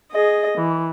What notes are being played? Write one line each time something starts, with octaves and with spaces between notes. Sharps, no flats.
G#4 D#5
E3